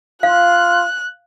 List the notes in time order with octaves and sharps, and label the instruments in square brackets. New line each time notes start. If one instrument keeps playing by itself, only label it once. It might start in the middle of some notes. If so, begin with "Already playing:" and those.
[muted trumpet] F4 [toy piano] F5 [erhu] F#6